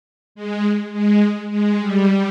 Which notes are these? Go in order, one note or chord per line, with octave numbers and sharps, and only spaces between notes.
G#3
G#3
G#3
G3